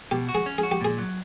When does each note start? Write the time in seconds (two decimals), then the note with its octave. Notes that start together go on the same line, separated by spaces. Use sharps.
0.11 B2 G4
0.29 F#4
0.35 G#4
0.46 C#4
0.58 F#4 G#4
0.71 G4
0.81 A#2 G#4
0.98 F#3